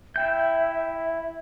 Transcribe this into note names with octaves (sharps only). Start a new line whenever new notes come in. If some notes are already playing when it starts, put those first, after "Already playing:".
E4 E5 G5 G6